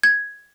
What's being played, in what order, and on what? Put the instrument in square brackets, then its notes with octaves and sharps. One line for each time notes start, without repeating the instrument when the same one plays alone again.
[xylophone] G#6